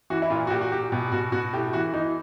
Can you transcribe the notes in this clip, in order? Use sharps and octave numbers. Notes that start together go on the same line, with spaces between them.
E3 F#4
E4
A#2 F4
F#4
A#2 G4
F#4
A#2 G4
B2 G4
B2 F#4
B2 F#4
A2 G4
E3 F#4
E3 D#4